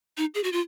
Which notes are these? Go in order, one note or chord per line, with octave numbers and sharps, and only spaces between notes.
D#4
G#4
F#4
F4